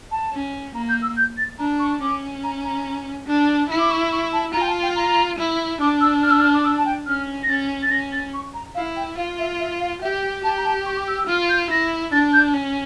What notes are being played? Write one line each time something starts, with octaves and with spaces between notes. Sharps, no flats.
A5
C#4
A#3 A#5
G6
E6
G6
A6
D4 A#5
C#6
C#4 D6
A#5
A#5
D4
E4
D6
C#6
C#6
A5
F4 A#5
G5
A5
G5
A#5
E4
D4 D6
E6
F6
E6
F6
D6
E6
A5
G5
C#4 F6
A#6
C#4 A6
A6
C#4 A#6
A6
C#6
A#5
E4 F5
G5
F4 F5
E5
E5
F5
G4 E5
G5
G4 A5
A#5
A5
C#6
D6
E6
E6
F4 F6
G6
E4 A#6
D4 A6
G6
C#4